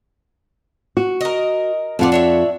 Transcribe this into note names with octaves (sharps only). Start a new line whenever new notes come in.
F#4
A#4 D#5
F2 A3 F4 D5 F#5
D4 C#5 E5